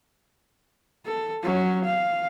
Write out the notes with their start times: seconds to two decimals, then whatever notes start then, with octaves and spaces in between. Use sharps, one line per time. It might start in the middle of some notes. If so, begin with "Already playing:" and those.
1.06 A4
1.43 F#3 C#4
1.85 F5